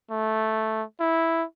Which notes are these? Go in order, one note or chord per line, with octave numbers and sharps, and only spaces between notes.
A3
E4